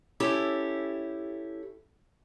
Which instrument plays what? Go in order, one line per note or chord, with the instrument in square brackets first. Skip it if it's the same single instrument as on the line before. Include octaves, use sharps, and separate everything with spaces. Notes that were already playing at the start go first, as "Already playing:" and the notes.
[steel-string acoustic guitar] C#4 E4 G4 A4